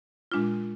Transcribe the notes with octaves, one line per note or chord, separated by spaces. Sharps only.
A#2 G#3 D4 F4